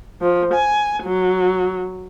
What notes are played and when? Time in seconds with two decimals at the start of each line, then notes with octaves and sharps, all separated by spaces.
0.21 F3
0.54 G#5
1.04 F#3